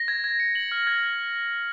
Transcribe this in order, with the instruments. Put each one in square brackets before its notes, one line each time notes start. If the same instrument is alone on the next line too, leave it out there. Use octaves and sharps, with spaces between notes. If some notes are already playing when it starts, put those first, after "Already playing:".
Already playing: [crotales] A#6
G#6
G#6
C#7
F#7
F6
G#6